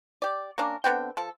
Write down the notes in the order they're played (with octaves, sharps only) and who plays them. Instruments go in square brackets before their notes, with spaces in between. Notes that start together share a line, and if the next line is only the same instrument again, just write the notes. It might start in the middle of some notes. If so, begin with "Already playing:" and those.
[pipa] G4 D5
A#3 C#4 D4 A#4
D3 B3 C4 G5
F3 A4